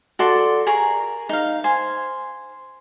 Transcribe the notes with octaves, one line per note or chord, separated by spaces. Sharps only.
F#4 A4 D5 C6
G#4 A#4 A#5 C#6
D#4 F5
C5 G#5